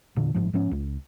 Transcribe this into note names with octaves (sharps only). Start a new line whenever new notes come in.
E1 A#2 D3
G1 G#2 F3
G#2 F3 B3 C#4
C#2